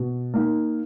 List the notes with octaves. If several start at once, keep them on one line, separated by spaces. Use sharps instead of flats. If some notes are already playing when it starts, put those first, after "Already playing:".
Already playing: B2
A#3 D#4